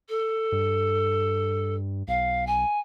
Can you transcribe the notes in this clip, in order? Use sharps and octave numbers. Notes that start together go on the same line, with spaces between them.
A4
G2
B1 F5
G#5